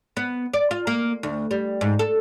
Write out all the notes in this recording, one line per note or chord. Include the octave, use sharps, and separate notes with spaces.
B3
D5
F4
A#3
D2
G3
G#2
A4